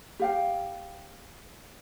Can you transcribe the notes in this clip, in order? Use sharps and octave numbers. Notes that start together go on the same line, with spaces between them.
G4 F5 G5